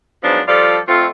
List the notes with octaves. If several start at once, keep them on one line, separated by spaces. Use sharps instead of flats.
G#2 F3 F#3 B3 D4
F3 G3 F4 A4 D5
F2 A3 C4 F4